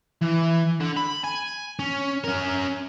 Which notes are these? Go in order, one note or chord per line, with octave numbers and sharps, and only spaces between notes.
E3
D3
B5
G#5
C#4
C#4 A#4